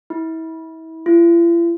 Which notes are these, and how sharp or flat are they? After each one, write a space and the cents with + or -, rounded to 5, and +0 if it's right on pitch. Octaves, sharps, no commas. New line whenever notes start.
E4 -35
E4 +45